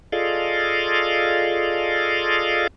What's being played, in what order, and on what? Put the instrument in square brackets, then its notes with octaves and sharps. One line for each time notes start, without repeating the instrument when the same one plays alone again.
[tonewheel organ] F4 G#4 A4 D5 D#5 F5